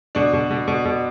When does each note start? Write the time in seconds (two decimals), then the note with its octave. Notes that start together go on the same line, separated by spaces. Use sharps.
0.15 B2 D4
0.33 B2
0.51 B2
0.68 B2
0.85 B2